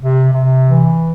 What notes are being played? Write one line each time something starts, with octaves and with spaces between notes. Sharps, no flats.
C3
C3
E3